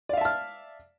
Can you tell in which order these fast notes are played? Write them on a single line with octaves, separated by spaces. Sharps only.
D5 F5 E5 A5 F6